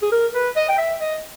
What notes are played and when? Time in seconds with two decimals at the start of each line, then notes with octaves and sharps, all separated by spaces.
0.02 G#4
0.12 A#4
0.34 B4
0.56 D#5
0.69 G5
0.78 E5
1.00 D#5